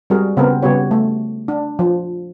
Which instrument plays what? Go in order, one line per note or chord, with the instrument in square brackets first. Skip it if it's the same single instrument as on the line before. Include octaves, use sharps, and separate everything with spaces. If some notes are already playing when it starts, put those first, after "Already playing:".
[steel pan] G3 G#3 C4 F#4 G#4 A#4
C#3 B3 C4 A#4
C#3 G3 B3 F#4 G4 C#5
A3
D4
F3